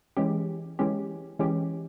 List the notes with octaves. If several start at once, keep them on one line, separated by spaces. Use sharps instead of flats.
E3 G#3 C#4 G4
E3 G#3 C#4 G4
E3 G#3 C#4 G4